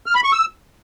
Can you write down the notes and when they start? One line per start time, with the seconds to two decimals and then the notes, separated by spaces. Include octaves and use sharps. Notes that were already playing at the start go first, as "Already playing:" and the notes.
0.06 F6
0.15 B5
0.24 C#6
0.33 E6